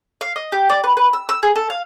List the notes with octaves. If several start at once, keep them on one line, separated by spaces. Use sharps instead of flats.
F5
D#5
G4
D5
B4
B4
E6
E6
G#4
A4
F5